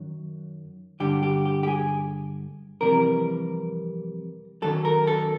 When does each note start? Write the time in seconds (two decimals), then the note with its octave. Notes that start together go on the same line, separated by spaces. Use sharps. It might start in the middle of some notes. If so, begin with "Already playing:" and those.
Already playing: F#2 D#3 F#3
1.00 G2 D3 G3 G4
1.23 G4
1.45 G4
1.63 G4
1.68 G#4
2.81 F2 C3 E3 G3 A#4
4.62 F#2 D#3 F#3 A4
4.85 A#4
5.07 A4